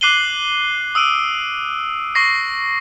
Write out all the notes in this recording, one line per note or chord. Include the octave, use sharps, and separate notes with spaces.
D6 F#6 C7 D#7 F#7 G7
D#6 E6 D7 D#7
C#6 E6 A#6 C7